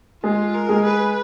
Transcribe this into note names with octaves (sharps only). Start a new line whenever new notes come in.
G#3 F4 G#4
A#4
G#3 G#4
B4